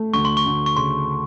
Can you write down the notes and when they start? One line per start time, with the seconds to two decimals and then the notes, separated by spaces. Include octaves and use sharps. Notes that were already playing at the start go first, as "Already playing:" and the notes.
Already playing: A3
0.14 D2 C#6
0.25 C6
0.37 C#6
0.46 D2
0.66 C#6
0.77 C#3 C6